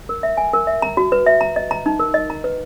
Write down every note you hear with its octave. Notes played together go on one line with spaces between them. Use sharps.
A#4
E5
G#5
A#4
E5
A#5
F#4
B4
E5
A#5
D#5
A#5
D#4
A#4
D#5
A#5
B4